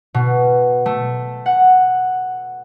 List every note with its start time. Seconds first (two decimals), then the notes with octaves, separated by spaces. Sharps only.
0.14 B2
0.86 A3
1.46 F#5